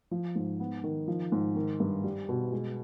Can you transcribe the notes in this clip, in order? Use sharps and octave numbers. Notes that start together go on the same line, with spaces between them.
F3
G#2
B3
D#3
F3
G#2
D#3
G2
G3
B2
G#3